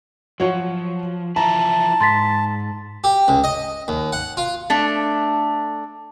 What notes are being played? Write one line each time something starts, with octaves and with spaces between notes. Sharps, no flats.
F3 F#3 C#5
E3 F3 E4 A5 A#5
G#2 C6 A6 B6
G4
C#2
D#5
D#2
F#5
F4
A3 D4